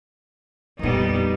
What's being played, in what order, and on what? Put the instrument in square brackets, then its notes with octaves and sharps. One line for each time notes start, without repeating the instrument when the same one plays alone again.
[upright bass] F2 A#2 [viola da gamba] G3 B3 D#4